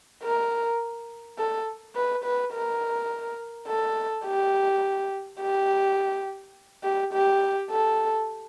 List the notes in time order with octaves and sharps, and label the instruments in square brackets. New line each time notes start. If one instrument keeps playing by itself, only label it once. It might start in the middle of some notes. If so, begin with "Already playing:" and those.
[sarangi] A#4
A4
B4
B4
A#4
A4
G4
G4
G4
G4
A4